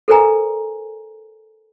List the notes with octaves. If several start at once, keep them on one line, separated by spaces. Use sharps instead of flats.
A4 A#4 C5 D5 G#5 A#5